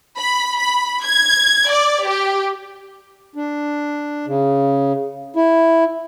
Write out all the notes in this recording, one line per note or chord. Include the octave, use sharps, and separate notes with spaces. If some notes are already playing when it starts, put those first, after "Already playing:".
B5
B5
G#6
D5
G4
D4
C#3
E4